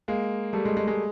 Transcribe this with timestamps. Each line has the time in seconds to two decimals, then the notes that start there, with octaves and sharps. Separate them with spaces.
0.08 G#3 A#3
0.53 G3 A3
0.65 G#3
0.77 G#3
0.87 G#3